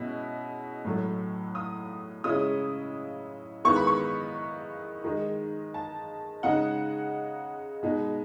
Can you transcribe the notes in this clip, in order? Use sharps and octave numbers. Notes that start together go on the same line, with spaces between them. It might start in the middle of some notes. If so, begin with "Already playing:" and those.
Already playing: B2 G#3 C#4 E4
A2 F#3 A3
D#6
C#3 G#3 C#4 E4 D#6
D#3 G#3 B3 E4 C#6
B5
C#6
D#3 G#3 D#4
A5
C#3 G#3 D#4 F#5
B2 G#3 D#4